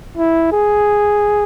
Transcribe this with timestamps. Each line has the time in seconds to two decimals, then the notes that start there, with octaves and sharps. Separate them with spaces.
0.17 E4
0.52 G#4